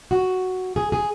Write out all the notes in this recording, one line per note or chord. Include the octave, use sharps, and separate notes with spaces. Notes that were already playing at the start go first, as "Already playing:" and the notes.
F#4
G#4
G#4